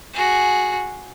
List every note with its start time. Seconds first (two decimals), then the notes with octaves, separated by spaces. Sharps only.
0.14 F#4 G#4